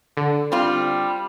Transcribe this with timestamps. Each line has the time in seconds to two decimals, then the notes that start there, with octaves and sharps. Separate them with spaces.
0.17 D3
0.52 G3 C4 F4